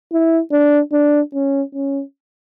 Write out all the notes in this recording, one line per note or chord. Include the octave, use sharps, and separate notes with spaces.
E4
D4
D4
C#4
C#4